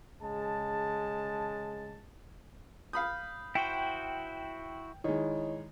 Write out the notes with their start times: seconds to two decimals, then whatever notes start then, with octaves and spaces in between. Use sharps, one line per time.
0.22 C#3 G#3 A5
2.93 F5 B5 D#6 G6
3.55 E4 F#4 C5 G5
5.04 D#3 G#3 E4 C#5 D#5